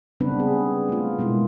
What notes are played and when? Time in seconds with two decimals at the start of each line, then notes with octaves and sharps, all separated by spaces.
0.20 C#3 G3 B3 C4 D4 B4
0.40 G#4
0.89 A3 F4
1.19 B2 G#3 A#3 E4